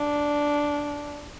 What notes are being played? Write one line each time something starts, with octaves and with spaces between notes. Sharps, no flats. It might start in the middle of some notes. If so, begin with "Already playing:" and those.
Already playing: D4